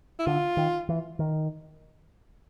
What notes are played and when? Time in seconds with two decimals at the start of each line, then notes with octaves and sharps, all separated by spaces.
0.19 E4
0.26 D3 F4
0.57 D#3
0.89 E3
1.19 D#3